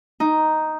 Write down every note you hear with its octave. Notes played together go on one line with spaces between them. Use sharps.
D#4